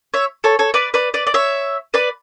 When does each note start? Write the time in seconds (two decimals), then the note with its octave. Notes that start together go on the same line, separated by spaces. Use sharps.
0.14 C#5 E5
0.44 A4 C#5
0.59 A4 C#5
0.74 B4 D5
0.94 B4 D5
1.14 B4 D5
1.27 D5
1.34 C#5 E5
1.94 B4 D5